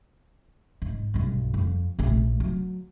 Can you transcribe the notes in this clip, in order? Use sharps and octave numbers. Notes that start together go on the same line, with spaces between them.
G#2
B1 G2
F2
A#1 A3
F#3